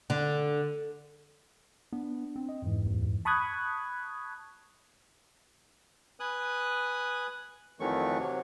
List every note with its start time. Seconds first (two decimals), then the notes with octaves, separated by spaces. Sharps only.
0.10 D3
1.93 B3 D4
2.36 C4
2.49 D#5
2.62 F2 G#2 E3
2.86 D#2
3.25 A5 B5 C#6 D#6 F#6 G#6
6.20 B4 G#5 D#6 F#6
7.80 F2 D#3 E3 F#3 A3 C#6
8.18 C3 F#3